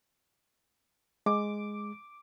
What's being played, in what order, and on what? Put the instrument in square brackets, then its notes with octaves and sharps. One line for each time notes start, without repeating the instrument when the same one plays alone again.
[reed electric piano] G#3 [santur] D6